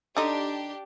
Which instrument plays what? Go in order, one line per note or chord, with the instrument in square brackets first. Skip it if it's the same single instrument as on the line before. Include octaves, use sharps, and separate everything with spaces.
[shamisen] D3 D#4 [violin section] D4 G4